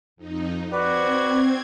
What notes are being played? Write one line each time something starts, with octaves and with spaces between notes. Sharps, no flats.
F2 D#4
C4 F#4 B4 D5 G#6